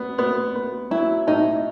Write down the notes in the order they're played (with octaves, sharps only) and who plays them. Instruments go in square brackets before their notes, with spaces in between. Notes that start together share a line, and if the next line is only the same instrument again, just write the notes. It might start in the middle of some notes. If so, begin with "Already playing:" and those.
Already playing: [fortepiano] B3
B3
B3
[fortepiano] F#3 [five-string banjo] E4
[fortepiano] A2 [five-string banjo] D#4